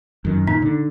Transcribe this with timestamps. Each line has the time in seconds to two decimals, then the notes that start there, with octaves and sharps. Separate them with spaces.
0.25 F#2 D#3
0.48 A#2 D#4
0.62 D3